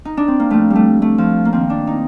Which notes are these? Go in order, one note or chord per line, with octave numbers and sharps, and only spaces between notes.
D#4
D4
C4
A#3
A2 F3 A3
G3
A3
A3
F3
A#3
F2 D#3 C4
D4
D#4